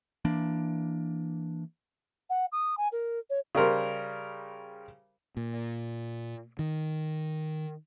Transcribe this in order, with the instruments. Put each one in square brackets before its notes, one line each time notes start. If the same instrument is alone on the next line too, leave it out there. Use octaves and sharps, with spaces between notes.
[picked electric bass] E3 A#3 D4
[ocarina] F#5
D#6
G#5
A#4
C#5
[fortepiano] C#3 G3 A#4 C5
[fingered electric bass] A#2
D#3